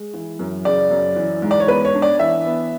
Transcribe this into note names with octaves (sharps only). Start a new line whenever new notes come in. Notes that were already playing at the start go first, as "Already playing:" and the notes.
Already playing: G#3
E3
F#2
C#3 D5
F#2
E3
G#2
D5
C#5
B3 B4
C#5
D4
D5
E3 E5
B3